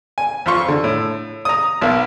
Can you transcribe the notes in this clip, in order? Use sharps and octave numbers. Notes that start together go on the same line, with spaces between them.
G#5
F2 F4 C6 C#6
D3
A2
A#5 D#6
B1 A#3 B3